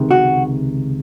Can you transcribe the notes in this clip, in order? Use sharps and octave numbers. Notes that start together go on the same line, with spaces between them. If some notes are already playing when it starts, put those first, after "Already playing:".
Already playing: C#2 C3 D#3 G#3
F#4